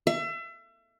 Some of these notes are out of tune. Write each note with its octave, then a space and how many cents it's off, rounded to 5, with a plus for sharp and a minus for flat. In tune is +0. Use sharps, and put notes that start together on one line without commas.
E5 +35